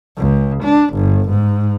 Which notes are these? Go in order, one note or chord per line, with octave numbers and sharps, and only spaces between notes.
C#2
D4
G1
G#2